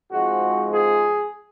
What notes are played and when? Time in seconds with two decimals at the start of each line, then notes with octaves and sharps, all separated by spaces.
0.10 G#2 F3 G#3 C4 F#4
0.74 G#4